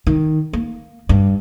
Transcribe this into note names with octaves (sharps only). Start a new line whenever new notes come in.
D#3
A#3
G2